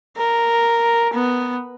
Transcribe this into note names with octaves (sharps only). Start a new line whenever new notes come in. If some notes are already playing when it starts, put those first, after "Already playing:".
A#4
B3